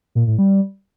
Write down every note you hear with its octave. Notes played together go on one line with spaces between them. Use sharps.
A#2
A2
G3